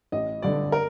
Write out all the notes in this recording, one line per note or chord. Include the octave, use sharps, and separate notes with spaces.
A1 D#5
G2 D3 D5
A#4